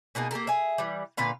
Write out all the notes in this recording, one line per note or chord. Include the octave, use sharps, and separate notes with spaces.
B2 A#3 D#4 G#4
A#3 G4 A4 A#4
G#4 E5
E3 G3
A#2 D3 B4 F5